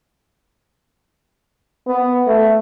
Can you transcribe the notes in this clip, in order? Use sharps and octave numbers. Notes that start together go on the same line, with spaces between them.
B3
A3